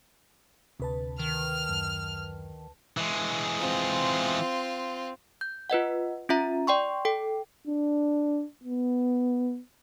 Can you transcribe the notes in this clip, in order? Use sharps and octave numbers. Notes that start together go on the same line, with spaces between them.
D2 C3 B4 A5
D#3 F6
F#2
E3 G#3
C4 F4
G6
F4 B4 D#5 F#5
C#4 F4 E5 A#5
D5 G5 C6 C#6
A4 G5
D4
B3